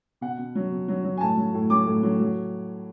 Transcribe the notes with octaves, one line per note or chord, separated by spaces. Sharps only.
B2 F#5
B2
F#3
B2
F#3
F#3
G#5
A2 A5
F#3
A2
F#3 D6
A2
F#3
F#3